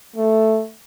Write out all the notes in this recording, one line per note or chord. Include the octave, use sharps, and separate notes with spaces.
A3